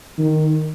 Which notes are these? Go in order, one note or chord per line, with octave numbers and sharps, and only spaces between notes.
D#3